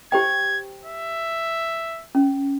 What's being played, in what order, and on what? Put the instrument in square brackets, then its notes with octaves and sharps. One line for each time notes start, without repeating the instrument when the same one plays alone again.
[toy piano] G4 C5 G5 [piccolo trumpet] G#6
[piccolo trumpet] E5
[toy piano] C#4